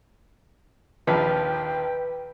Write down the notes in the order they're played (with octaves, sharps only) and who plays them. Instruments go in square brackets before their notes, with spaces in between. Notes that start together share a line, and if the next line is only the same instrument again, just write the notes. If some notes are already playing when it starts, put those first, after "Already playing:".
[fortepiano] A#1 D#2 F3 [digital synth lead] B4 [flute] G5